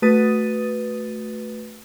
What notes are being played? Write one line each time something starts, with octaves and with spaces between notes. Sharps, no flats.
A3 F#4 B4 D#6 A6 D#7